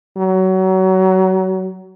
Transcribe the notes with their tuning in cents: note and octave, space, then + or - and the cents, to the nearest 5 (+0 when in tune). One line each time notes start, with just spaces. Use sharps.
F#3 +25